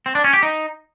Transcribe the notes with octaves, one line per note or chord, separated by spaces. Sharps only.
C4
D4
C#4
G4
D#4